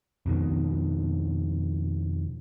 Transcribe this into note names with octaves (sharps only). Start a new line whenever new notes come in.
F2 B2 D#3